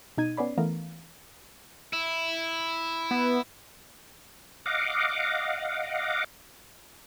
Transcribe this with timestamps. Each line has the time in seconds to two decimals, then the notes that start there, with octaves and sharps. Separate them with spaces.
0.17 B2 D#4 G#6 D#7
0.37 B3 C#4 D5 B5 C7
0.58 E3 A3 B3 A#4 F5
1.93 E4
3.11 B3
4.66 D#5 F5 F#5 D6